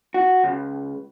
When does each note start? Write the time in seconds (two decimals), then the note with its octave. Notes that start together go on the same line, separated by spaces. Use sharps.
0.14 F#4
0.43 C#2